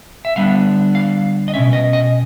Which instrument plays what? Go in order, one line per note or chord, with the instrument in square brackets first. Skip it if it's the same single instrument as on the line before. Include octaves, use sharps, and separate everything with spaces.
[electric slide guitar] E5
D3 G3 B3 D4 F5
F5
D#5
B2 G#3 C#4 E5
D#5
D#5